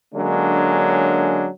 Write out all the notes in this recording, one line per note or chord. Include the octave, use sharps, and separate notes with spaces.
D3 F#3 G#3 A#3 C#4 D4